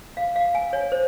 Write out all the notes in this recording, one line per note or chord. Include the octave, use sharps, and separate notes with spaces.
F5
F5
G#5
C#5
C5